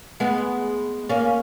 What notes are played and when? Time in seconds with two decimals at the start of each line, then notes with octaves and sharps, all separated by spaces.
0.20 G#3 B3
1.09 A#3 C#4